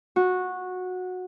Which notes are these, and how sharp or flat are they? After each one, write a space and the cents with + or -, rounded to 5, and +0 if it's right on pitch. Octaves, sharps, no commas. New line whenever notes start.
F#4 -15